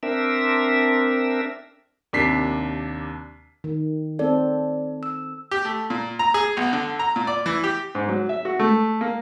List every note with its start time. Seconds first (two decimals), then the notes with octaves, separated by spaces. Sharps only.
0.03 C4 D4 A#4 E5
2.13 D#2 C3 D4 B6 C7
3.64 D#3
4.19 C4 A4 D5
5.03 E6
5.51 G4
5.65 A3
5.90 A#2
6.19 A#5
6.34 G#4
6.57 B1
6.73 D3
6.99 A#5
7.16 A#2
7.27 D5
7.46 E3
7.64 G4
7.95 G#2
8.09 F#3
8.29 E5
8.45 F#4
8.59 A3
9.01 A#3